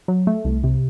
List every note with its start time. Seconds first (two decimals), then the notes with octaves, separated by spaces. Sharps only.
0.08 F#3
0.27 A3
0.45 C2
0.63 C3